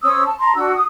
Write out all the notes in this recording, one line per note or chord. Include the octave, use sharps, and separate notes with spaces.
C#4 C5 D#6 E6
A5
A5 A#5 C6
D4 F#4 E6
D#6